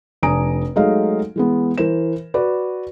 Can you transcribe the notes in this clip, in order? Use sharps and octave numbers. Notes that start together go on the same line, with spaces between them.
F1 D4 G#5 A#5 D#6 D7
F#3 G#3 A3 D#4 D#5 F5
E3 G#3 B3
E3 A#4 C5 E7
F#4 B4 D5